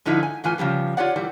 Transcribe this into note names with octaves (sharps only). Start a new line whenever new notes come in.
G#2 D3 F3 D#4 E4
G#5
A2 E3 F4 B4 G#5
C#3 F3 G3 B3
F4 G4 C#5 D5 F#5
A#2 E3 G3